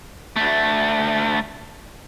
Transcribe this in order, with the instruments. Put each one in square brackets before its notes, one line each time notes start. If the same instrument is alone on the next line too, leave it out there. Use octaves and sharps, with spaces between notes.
[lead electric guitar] D2 A3